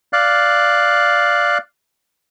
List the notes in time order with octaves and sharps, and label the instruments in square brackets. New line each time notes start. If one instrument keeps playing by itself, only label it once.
[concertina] D5 F5 F#6